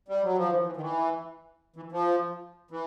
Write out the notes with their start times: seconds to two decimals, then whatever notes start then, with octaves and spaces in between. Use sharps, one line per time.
0.08 G3
0.23 F#3
0.37 F3
0.50 E3
0.66 E3
0.77 D#3
0.81 E3
1.76 E3
1.92 F3
2.71 E3